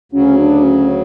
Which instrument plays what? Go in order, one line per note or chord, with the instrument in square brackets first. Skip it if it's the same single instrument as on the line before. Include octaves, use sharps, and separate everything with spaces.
[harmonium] D2 C#3 F#3 [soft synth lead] C#4
[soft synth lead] D4
C#4